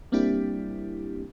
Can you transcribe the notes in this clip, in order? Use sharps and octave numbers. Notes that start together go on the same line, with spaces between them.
G3 A#3 C4 D4 E4 G4